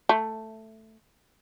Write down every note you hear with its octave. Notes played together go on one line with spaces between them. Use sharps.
A3